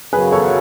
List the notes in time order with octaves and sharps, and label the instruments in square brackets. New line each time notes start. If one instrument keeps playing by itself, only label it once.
[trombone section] F#2 C#3 F#3 [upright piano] G#4 B4
[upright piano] A4 C#5